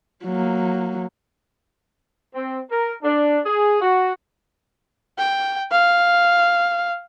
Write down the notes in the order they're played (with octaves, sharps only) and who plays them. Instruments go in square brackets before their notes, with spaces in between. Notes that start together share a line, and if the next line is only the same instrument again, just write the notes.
[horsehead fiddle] F#3 A#3
[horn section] C4
A#4
D4
G#4
F#4
[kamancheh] G5
F5